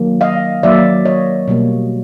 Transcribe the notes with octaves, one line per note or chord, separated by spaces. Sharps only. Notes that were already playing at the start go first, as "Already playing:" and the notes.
Already playing: D#3 F#3 A#3
D#5 F5
D#3 F#3 A#3 D5 E5
C#5 D#5
B2 G3 A#3